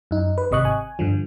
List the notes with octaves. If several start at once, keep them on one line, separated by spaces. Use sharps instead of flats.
F#2 D#4
B4
G#1 C3 D#5 C#6 F#6
G#5
G2 D3 F3